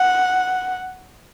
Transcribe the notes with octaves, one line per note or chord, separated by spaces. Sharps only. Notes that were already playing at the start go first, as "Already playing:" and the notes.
Already playing: F#5